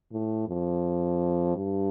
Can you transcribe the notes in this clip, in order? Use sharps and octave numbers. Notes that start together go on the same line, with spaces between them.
A2
F2
G2